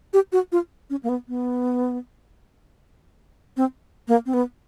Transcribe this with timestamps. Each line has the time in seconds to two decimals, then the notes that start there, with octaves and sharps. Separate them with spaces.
0.13 G4
0.32 F#4
0.52 F4
0.90 C#4
1.03 A#3
1.09 B3
1.28 B3
3.57 C4
4.08 A#3
4.26 C4
4.34 B3